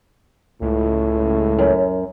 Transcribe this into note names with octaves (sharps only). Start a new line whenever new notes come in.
C#2 A2
F#2